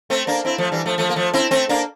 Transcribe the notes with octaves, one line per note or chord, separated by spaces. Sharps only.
A3 C4
A#3 D4
C4 E4
F3 A3
E3 G3
F3 A3
F3 A3
A#3
F3 A3
C4 E4
A3 C4
A#3 D4